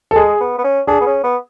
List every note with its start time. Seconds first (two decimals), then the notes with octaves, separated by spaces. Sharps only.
0.11 A4
0.16 G#3 G#4
0.41 B3
0.58 B3
0.64 C#4
0.87 D4 G#4
1.01 B3
1.07 C#4
1.24 B3